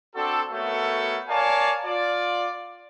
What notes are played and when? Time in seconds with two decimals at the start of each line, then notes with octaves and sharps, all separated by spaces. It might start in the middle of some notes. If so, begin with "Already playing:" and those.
0.14 C4 D4 F#4 A4
0.52 A3 B3 F#4 A4 A#4 C#5
1.28 A#4 C#5 D5 F5 G#5 A5
1.84 F4 D5